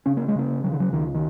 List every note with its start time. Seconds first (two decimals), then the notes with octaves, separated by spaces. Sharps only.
0.06 C#3 C#4
0.17 A#3
0.28 G#3
0.35 C#3 A#3
0.64 C#3 F#3
0.72 D#3
0.80 F#3
0.92 C#2 D#3
1.14 D#3